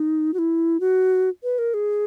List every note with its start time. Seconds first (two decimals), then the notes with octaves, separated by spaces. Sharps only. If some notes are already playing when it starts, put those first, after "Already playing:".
Already playing: D#4
0.34 F#4
0.39 E4
0.80 F#4
1.43 B4
1.58 A#4
1.74 G#4